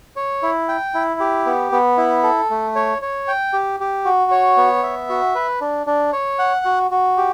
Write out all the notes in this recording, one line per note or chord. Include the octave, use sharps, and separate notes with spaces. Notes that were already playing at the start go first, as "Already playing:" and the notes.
C#5
E4
G5
E4
G4
B3
B3
E4
A4
A3
C#5
C#5
G5
G4
G4
F#4
C#5
B3
E5
F#4
B4
D4
D4
C#5
F#5
F#4
F#4
G4